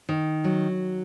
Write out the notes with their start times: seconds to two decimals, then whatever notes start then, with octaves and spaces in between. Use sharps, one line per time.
0.09 D#3
0.44 F#3